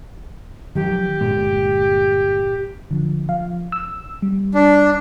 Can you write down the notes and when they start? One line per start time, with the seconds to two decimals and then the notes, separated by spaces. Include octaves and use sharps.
0.75 D#3 F3 F#3 G4
1.21 G1 A#2 G#3
2.91 D3 F3
3.29 F3 F5
3.72 E6
4.22 G3
4.54 D4